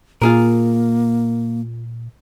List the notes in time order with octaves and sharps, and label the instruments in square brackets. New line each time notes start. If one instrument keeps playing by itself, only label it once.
[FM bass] A#2 [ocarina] A#3 [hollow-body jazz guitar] F4 G#4 A#4